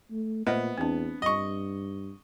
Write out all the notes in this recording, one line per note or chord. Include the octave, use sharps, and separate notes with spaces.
A3
A#2 A3 B3 C5 D#5
E2 C4 D4
G2 D#5 C#6